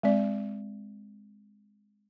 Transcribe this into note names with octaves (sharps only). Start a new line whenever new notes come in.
G#3 C4 D5